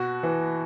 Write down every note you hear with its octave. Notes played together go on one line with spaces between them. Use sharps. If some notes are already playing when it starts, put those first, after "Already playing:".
Already playing: B2 F#4
E3